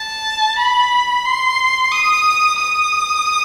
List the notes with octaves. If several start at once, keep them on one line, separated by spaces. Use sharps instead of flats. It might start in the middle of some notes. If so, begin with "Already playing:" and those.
Already playing: A5
B5
C6
D#6
D#6